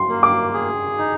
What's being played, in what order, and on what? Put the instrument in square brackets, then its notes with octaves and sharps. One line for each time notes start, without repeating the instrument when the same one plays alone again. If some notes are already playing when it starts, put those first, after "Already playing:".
Already playing: [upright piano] C6
[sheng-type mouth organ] A#3
[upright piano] D6
[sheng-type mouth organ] G#4
D#4